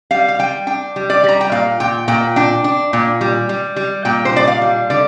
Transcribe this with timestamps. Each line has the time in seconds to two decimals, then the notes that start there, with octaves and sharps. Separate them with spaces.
0.11 G3 F5
0.28 F5
0.39 G3 G5
0.67 D4 G5
0.96 G3
1.10 D5
1.24 G3 A#5
1.41 G5
1.52 A#2 F5
1.80 A#2 G5
2.08 A#2 G5
2.36 D4 G5
2.64 D4
2.93 A#2
3.21 G3
3.49 G3
3.76 G3
4.05 A#2 G5
4.25 C5
4.33 D4 D5
4.48 F5
4.62 G3
4.90 D3 D5